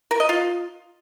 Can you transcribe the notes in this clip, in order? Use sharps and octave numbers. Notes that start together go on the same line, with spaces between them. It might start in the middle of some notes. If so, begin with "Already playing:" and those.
A#4
D#5
F4